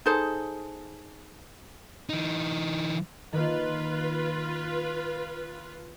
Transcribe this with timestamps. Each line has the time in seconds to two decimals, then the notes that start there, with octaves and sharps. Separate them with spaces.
0.06 D#4 G#4 A4 C5
2.09 E3 D#4
3.33 D#3 A#3 F4 B4